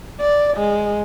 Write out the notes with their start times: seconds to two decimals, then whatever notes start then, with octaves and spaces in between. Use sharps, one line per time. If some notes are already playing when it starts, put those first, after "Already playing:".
0.20 D5
0.57 G#3